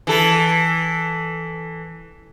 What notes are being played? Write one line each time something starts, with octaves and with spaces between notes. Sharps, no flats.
E3 A4